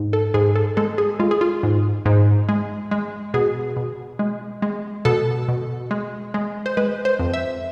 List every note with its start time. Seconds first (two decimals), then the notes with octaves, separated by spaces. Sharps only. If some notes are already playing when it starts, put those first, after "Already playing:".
Already playing: G#2
0.13 A4
0.34 G#2 G#4
0.56 A4
0.77 G#3 A4
0.98 G#4
1.20 G#3 F4
1.31 G#4
1.41 F4
1.63 G#2
2.06 G#2
2.49 G#3
2.91 G#3
3.34 B2 G#4
3.77 B2
4.19 G#3
4.62 G#3
5.05 B2 A4
5.48 B2
5.91 G#3
6.34 G#3
6.66 C5
6.77 G#3 B4
7.05 C5
7.19 F2
7.34 E5